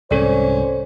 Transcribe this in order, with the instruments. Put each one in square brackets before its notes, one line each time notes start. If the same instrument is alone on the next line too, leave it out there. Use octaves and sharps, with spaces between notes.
[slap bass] C2 G#2 [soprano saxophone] C#4 [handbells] A4 D5 [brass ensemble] C5